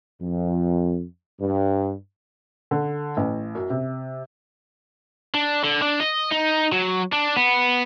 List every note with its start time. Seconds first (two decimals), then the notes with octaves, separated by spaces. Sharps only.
0.21 F2
1.40 G2
2.71 D3
3.17 A1
3.55 F#2
3.70 C3
5.34 D4
5.64 D3
5.82 D4
6.01 D#5
6.32 D#4
6.72 F#3
7.12 D4
7.37 B3